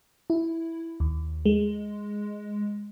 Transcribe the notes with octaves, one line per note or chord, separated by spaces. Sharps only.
E4
D#2
G#3